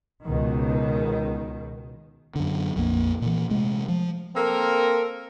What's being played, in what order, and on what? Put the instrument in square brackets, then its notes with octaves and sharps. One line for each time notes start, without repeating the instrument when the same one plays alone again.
[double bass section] C#2 B2 D#3
[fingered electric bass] F#2 D3
A#1 F2 C#3 A#3
A#2 E3
C3 G#3 A3
F3
[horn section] A#3 C4 A4 A#4